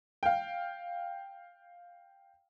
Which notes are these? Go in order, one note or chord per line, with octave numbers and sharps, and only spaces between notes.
F5 G5